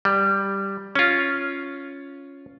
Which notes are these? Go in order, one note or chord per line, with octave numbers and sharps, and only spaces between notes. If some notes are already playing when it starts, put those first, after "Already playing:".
G3
C#4 F4